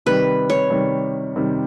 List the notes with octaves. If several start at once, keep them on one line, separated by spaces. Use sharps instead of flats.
C3 D#3 G3 B4
C#5
C3 D#3 G3
C3 D#3 G3